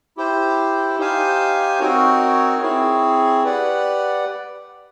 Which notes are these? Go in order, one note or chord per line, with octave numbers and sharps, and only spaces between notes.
E4 G4 C5
D#4 G4 C5 F5 G#5
C4 D#4 F#4 A#4 C#5
C4 E4 G#4 C#5
G4 B4 D5 F#5